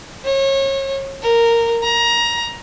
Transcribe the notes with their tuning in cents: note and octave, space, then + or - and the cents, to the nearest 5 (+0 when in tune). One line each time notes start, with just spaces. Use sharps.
C#5 -30
A#4 -10
A#5 +20